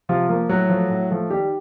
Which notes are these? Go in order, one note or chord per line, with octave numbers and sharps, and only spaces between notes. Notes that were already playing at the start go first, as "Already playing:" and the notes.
C3 F3 F4
F3 A#3
A2 F#3 F#4
F3 A3
A2
F3 A3
D#3 G3 G4